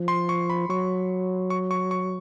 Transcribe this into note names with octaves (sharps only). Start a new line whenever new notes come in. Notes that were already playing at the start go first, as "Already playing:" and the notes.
Already playing: F3
C6
C#6
B5
F#3 C#6
C#6
C#6
C#6